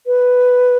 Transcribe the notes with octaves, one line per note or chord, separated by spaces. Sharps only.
B4